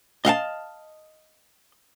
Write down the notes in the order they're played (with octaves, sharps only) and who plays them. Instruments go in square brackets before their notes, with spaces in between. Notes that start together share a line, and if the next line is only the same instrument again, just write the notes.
[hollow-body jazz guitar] D#5 F5 F#5 A5